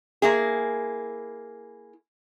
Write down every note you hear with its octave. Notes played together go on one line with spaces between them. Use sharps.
A#3 E4 G#4